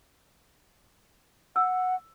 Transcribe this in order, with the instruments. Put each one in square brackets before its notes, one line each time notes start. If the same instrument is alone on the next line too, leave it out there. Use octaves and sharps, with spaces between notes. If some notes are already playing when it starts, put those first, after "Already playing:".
[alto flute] F#5 [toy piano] E6